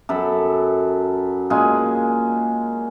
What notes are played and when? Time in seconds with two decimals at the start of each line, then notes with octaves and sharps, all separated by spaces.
0.09 F#2 A4 B5
1.50 A#2 G#3 C#4 G#5